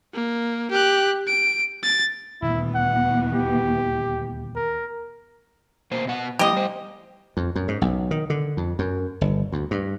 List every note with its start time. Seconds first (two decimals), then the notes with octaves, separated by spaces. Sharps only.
0.13 A#3
0.71 G4 F#6
1.27 D7
1.83 A6
2.42 D#1 D2 B2 E3 B3 E4
2.75 F#5
3.34 G4
4.56 A#4
5.91 B2 A#3 C5
6.05 B2 B3 F#5
6.39 F3 A3 E4 G4 D#5
6.53 G3 C5
7.37 F2
7.56 F#2
7.68 G#2
7.82 B1
8.11 D#3
8.30 D3
8.57 F2
8.79 F#2
9.21 G1
9.52 D2
9.71 G2